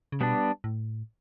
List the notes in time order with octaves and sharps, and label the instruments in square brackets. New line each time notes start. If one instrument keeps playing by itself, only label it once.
[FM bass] C#3
[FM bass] B2 [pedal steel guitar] G3 B3 D4
[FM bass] A2